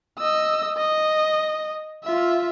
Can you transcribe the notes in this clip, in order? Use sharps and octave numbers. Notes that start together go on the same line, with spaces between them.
D#5 E6
D#5
F4 E5